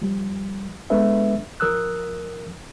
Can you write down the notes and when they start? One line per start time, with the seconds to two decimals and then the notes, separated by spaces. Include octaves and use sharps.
0.02 F3 G3
0.90 G#3 B3 D4 A4 B4 E5
1.60 F3 A#4 D#6 E6 F#6